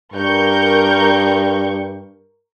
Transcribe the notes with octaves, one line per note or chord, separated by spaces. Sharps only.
G2 A#4 C#6 G6